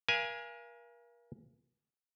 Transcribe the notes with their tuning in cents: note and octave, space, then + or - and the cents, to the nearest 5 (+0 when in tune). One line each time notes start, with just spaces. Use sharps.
A#4 +40 F5 -35 G#5 +0